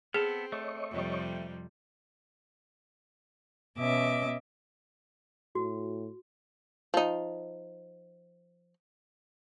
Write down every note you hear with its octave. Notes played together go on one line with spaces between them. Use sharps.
B3 C4 G#4 A4
A3 C#5 D#5 C#6
F2 C3 G3
B2 C#4 D#5 E5 D6
A2 F#4
F3 D#4